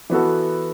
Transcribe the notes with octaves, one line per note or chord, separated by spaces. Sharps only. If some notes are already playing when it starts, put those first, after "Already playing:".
E3 B3 F#4 A4